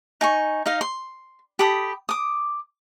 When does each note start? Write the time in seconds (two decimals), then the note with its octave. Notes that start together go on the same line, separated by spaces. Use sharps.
0.21 D#4 G#5 C#6
0.66 D#4 D#5 F5
0.81 C6
1.59 G4 A4 B5 D#6
2.09 D6 D#6